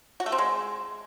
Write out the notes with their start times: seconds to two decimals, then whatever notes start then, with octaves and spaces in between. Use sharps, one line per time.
0.20 F#4
0.26 A3
0.32 C4
0.38 G#3